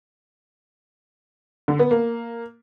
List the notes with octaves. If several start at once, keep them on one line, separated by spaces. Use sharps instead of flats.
D3
B3
A#3